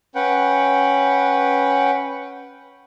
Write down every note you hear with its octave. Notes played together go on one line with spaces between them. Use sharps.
C#4 B4 F#5 G5